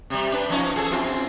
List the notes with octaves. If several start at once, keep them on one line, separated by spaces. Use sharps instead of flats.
C3 G3
D4 B4
F3 C#4 D#4
G#4 A4
F#2 C4 F4